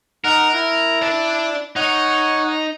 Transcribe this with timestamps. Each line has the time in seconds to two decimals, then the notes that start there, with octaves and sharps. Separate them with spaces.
0.24 D#4 A#4 F#5 F6
0.54 E4
1.02 D5 A5
1.76 D#4 C#5 F#5 C#6